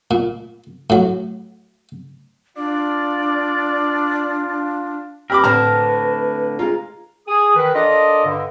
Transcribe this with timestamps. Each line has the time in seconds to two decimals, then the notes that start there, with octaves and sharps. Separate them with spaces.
0.11 A#2
0.90 A2 F#3
2.57 D4 F4 D5
5.30 G4 A#4 B5 D6 E6
5.44 A2 D3 C4 B4 A#5
6.59 G#3 F4 A#5
7.28 G#4 D#6
7.56 D#3 B4
7.75 D4 F4 A4 A#4 D5 D#5
8.26 G2 D3